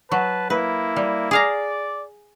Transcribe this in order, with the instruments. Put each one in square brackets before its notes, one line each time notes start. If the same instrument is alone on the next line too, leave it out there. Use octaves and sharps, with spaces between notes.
[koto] F#3 [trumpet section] B4 A5
[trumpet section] A#3 E4 [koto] B4
[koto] G3
[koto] G#4 F5 A#5 [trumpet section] D5